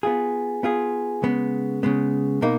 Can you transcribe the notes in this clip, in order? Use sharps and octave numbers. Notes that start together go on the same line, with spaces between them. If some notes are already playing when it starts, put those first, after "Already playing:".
B3 F4 G#4
B3 F4 G#4
C#3 G#3 B3
C#3 G#3 B3
B2 A#3 D#4